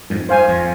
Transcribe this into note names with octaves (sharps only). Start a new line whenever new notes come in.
F2 G#2
C5 F5 G#5
F2